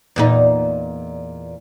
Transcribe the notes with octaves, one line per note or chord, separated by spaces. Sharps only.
E2 A#2 D#4